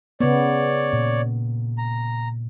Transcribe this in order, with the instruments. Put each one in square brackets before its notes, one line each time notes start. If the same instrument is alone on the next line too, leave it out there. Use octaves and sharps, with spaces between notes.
[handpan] C#3 B3 [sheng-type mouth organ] C#5 D5
[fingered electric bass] A#2
[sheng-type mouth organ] A#5